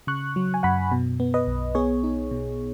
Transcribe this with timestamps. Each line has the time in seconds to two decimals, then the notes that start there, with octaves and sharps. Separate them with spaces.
0.07 C#3 C#6 F#6
0.36 F#3
0.54 G#5
0.63 F#2 F#5 B5
0.92 B2
1.20 B3
1.34 B4 D#5
1.47 B1
1.75 B3 G#4 C#5
2.04 D#4
2.31 B2